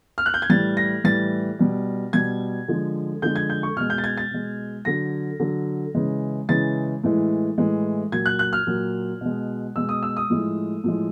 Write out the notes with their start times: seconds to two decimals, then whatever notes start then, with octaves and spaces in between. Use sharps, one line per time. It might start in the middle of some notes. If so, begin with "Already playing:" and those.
0.18 F6
0.26 F#6
0.34 G6
0.42 G#6
0.50 A2 E3 G3 A6
0.77 A#6
1.04 A2 E3 G3 A6
1.59 B2 G3
2.13 B2 G3 G#6
2.68 D3 F3 G#3
3.22 D3 F3 G#3 G6
3.36 G#6
3.50 G6
3.63 C#6
3.77 B2 G#3 F6
3.90 G6
3.98 A6
4.04 G#6
4.17 A6
4.31 B2 G#3
4.85 D3 F#3 A#6
5.40 D3 F#3
5.95 C#3 E3 G#3
6.49 C#3 E3 G#3 A6
7.04 A2 E3 G#3
7.58 A2 E3 G#3
8.12 A#2 F#3 G#6
8.26 F#6
8.39 F#6
8.53 F6
8.67 A#2 F#3
9.21 B2 G#3
9.75 B2 G#3 E6
9.89 D#6
10.03 E6
10.17 D#6
10.30 A2 F3 G#3
10.84 A2 F3 G#3